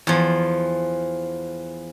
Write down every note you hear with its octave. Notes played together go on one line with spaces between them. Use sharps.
E2 F3